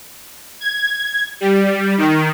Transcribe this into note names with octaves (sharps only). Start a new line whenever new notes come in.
G#6
G3
D#3